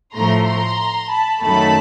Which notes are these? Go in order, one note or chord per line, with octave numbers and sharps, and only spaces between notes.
A2 F3 A3 A#5 C6
A#5 C6
A5 B5
F#2 D#3 F#3 A3 A5 B5